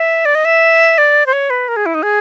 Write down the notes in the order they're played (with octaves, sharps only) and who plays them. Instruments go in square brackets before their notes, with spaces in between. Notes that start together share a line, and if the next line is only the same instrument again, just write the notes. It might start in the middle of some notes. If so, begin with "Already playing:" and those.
Already playing: [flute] E5
D5
D#5
E5
D5
C5
C#5
B4
A#4
G#4
E4
D#4
G#4